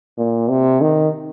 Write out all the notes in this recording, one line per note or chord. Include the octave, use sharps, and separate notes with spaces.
A#2
C3
D#3